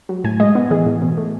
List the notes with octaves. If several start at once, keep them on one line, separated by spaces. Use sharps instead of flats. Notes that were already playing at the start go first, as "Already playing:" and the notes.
F#3
A2 G#5
G#3 D#5
B3
E3 G#4
A2
B2
A3